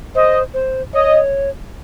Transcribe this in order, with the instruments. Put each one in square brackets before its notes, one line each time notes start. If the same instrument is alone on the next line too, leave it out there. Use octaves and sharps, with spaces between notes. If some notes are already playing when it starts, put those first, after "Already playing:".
[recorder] C5 [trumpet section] D#5
[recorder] C5
[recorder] C#5 [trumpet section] D#5